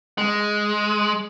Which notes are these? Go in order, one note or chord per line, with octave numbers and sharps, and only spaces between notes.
G#3